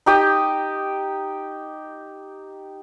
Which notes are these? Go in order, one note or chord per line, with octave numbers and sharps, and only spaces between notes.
D#4 G4 D#6